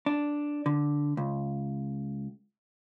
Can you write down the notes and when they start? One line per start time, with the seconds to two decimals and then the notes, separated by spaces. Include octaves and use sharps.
0.06 D4
0.66 D3
1.17 C#2